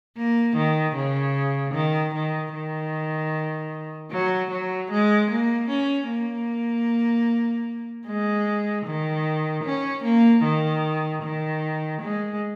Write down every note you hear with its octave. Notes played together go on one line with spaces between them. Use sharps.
A#3
D#3
C#3
D#3
D#3
D#3
F#3
F#3
G#3
A#3
C#4
A#3
G#3
D#3
C#4
A#3
D#3
D#3
G#3